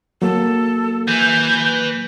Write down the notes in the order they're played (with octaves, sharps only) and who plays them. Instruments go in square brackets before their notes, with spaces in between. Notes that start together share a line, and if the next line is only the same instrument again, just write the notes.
[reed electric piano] F#3 A#3 [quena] A4
[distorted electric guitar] B4 G#5 [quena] G6